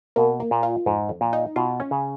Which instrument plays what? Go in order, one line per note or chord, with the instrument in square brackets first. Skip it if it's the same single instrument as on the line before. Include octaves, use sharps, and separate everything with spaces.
[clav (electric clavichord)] B2 [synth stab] A#3
[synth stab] A#3
[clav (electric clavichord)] A#2
[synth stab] F4
[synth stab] F2 [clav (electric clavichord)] G#2
[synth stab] F2
[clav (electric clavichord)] A#2
[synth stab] D#4
[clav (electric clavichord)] B2 [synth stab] F4
[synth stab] C#4
[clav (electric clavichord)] C#3